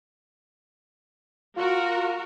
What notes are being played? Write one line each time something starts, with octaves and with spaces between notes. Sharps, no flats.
F4 F#4 A#4